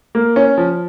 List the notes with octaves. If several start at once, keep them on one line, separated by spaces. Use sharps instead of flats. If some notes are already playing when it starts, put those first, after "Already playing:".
A#3
C#4
F3